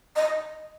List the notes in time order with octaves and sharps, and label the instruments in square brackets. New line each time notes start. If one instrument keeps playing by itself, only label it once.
[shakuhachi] D#5